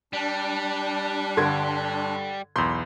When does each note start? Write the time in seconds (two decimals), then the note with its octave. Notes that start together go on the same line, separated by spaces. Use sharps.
0.13 G3 D4
1.37 G2 D3 A4 C6 G#6
2.56 B1 E2 B5 C6 G6